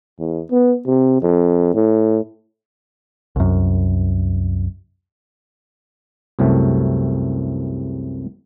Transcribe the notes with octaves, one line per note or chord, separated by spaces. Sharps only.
E2
B3
C3
F2
A2
C2 F#2
C2 F#2 C3 A3